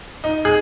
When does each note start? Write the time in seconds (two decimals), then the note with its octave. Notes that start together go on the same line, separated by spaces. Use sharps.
0.24 D#4
0.45 G#4